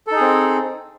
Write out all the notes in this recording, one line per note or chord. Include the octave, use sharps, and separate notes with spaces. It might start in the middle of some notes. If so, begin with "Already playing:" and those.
C4 D#4 G#4 A4